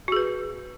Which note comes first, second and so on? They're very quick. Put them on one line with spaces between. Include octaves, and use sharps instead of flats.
F#4 G#4 B4